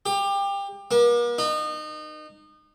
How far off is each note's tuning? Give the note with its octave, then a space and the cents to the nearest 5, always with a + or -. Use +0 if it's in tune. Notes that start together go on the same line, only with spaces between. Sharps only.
G4 +25
A#3 +45
D#4 -30